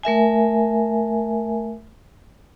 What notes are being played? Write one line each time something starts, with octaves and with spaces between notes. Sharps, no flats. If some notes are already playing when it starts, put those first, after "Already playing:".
A3 A#4 E5 G#5